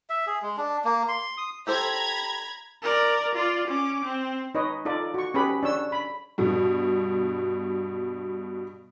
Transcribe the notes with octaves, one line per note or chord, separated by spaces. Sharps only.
E5
G#4
G#3
D4
A#3
C6
D#6
G4 A4 C5 A#5 B5 G#6
A#4 D5
F4 D5
C#4 D6
C4
D#4 B4 C#5 D#5
D#4 F4 A4 D5
F#4 C#6
C#4 G4 G#4 B4 B5
D4 C#5 E6
B5
G2 B2